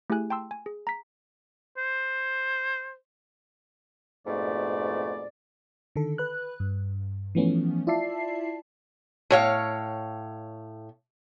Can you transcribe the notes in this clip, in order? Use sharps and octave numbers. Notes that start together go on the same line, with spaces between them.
A3 E4 G4 G#4 G#5 F#6
G5 A5 C6 E6
G#5
G#4
A#5 B6
C5
F2 G#2 B2 A3 D5
D3 D#3 A4
B4 F#6
G2
E3 F3 A3 B3 C#4
E4 F4 D5 E5 A5 C7
A2 C#5 F5